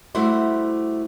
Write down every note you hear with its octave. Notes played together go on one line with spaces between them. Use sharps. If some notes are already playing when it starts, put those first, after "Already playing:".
G3 A3 E4 F#4 C5